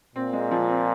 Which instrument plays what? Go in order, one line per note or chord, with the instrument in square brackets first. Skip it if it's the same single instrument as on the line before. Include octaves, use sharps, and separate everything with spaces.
[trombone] A#2 [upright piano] C4
[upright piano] G#3
F3
C4